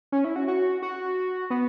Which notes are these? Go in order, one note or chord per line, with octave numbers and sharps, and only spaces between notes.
C#4
E4
F#4
F#4
F#4
B3